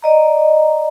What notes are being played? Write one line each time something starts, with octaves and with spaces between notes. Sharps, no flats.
D5 D#5 A#5